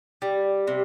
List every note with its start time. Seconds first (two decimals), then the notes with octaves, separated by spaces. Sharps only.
0.22 G3
0.67 C3